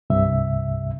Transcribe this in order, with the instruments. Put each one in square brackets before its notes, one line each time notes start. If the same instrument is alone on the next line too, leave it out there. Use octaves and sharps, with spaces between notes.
[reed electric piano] C2 G2 C3 E5